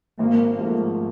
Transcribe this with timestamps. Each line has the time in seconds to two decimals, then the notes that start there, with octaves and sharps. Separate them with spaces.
0.19 G#1 A#3
0.59 G#2 F3 A3